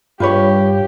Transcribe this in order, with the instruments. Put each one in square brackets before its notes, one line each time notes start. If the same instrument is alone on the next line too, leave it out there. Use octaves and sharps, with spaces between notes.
[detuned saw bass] G2 [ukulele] F4 B4 C#5 [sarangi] G4